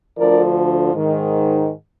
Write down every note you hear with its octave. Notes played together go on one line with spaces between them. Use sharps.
D2 D3 F3 A#4 D5
G#2 D#3